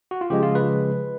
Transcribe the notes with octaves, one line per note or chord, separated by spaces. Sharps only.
F#4
F4
C#3 F3 G#3 G4
F4
B4